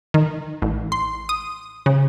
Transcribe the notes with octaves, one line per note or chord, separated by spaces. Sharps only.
D#3
A1
C6
D#6
C#3